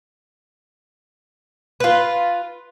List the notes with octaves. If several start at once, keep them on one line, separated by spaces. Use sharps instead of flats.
F4 B4